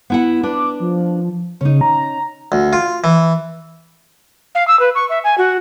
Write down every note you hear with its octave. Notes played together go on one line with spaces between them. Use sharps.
B3 E4 F#5
D4 B4 D6
F3
C#3 C#4 D#4
A#5
D2
F4
E3
F5
E6
B4
C#6
E5
G#5
F#4